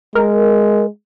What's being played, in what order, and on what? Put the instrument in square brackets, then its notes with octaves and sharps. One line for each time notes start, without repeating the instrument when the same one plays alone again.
[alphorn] G#3 [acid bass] A#4